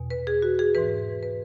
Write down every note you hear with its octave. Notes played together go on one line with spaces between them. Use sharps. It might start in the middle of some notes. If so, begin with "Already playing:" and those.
Already playing: E2 B2
B4
G#4
F#4
G#4
G#2 E3 B4
B4